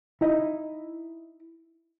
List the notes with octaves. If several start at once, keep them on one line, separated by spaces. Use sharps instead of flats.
D#4 E4 D#5